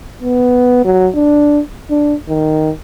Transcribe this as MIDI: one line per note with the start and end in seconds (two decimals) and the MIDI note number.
0.21 0.85 59
0.85 1.08 54
1.14 1.60 62
1.90 2.14 62
2.29 2.70 51